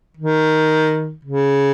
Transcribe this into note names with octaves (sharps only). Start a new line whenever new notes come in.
D#3
C#3